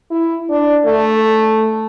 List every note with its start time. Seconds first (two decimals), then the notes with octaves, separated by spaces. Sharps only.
0.11 E4
0.49 D4
0.86 A3